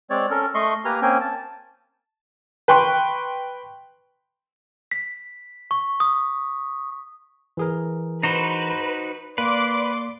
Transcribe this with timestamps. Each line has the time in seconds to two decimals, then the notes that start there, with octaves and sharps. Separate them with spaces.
0.10 G#3 C4 C#5 D5
0.31 C#4 A4 A#4
0.55 A3 D#5 C6 C#6
0.85 A#3 G4 B4 G#5 A#5 F6
1.02 A#3 C4 C#4 G5 G#5
1.21 A5
2.68 B4 G5 C6 C#6
4.91 B6
5.71 C#6
6.00 D#6
7.57 E3 G#4 A#4
8.23 D#4 F#4 B4 C5
9.38 A#3 B4 D5 C6 D6